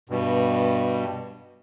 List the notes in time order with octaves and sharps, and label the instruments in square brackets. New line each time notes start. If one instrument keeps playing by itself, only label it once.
[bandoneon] G2 B2